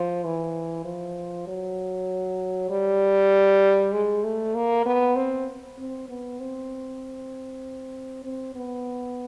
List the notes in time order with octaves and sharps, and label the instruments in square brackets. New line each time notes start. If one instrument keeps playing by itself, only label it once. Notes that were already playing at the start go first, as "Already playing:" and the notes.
Already playing: [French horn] F3
E3
F3
F#3
G3
G#3
A3
A#3
B3
C4
C4
B3
C4
C4
B3